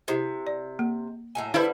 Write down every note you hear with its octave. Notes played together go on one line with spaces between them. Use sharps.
C3 E4 G4 C5
D5
A#3
A2 F#3 G#5
D3 G3 E4 B4 C5